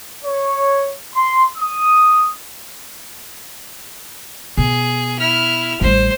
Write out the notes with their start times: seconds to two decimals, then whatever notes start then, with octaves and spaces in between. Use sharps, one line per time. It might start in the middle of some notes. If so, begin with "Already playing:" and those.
0.25 C#5
1.15 C6
1.58 D#6
4.57 B2 G#4
5.19 E4 F6
5.81 A1 G3 C5